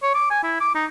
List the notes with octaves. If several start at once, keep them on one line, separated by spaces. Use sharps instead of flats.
C#5
D6
G#5
E4
D6
D#4